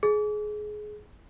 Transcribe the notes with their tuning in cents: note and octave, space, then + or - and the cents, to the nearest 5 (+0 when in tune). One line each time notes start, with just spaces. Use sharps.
G#4 +25